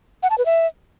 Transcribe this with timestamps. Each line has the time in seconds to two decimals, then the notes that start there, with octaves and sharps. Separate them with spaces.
0.23 F#5
0.30 A5
0.38 B4
0.46 E5